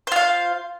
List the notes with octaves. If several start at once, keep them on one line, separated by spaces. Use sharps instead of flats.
F4 C5 F5